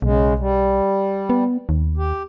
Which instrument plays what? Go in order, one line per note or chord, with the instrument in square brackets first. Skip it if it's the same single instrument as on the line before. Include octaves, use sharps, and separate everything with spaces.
[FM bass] B1 [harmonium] C#3 G#3
[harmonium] G3
[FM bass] B3
D#2
[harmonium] G4